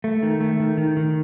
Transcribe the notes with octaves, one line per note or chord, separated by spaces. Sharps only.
A3
D#3
A3
D#3
D#3
D#3